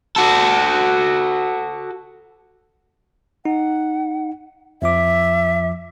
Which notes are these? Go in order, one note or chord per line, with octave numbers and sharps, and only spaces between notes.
F#4 A4
D#4 F#5
F2 F3 E5 D6